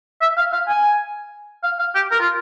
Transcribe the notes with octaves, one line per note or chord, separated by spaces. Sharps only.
E5
F5
F5
G#5
F5
F5
G4
A#4
F4